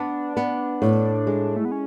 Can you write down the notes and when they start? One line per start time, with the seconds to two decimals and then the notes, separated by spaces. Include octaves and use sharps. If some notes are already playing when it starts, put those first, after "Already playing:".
Already playing: B3 D4
0.37 B3
0.82 A2
1.27 G#3
1.56 A3
1.65 B3
1.72 C#4